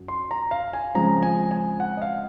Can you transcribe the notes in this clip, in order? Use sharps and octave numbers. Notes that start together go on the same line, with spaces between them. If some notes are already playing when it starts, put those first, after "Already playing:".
Already playing: F#2 F#3
C6
A#5
F5
G#5
C#3 F3 G#3 C4 A#5
G#5
G#5
F#5
D#5
F5